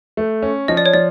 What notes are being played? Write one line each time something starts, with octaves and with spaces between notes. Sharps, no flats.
A3
C#4
F3 D#5
D5
C#5
F3 D5